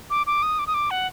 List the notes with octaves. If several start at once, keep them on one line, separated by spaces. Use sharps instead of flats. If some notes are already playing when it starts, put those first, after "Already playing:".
D6
D6
D#6
D6
D#6
D6
F#5